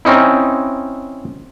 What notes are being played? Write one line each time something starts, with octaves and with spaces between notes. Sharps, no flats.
C4 C#4 D#4 E4